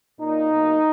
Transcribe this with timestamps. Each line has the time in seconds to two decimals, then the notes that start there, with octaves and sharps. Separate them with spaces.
0.21 A#2 A#3 D#4
0.51 B2 F#3 A#3